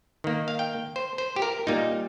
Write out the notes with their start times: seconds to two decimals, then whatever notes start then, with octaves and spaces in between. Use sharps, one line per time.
0.24 D#3 A#3
0.48 F5
0.59 G5
0.96 C5
1.18 C5
1.36 G4
1.42 A#4
1.67 A#2 G3 A#3 D#4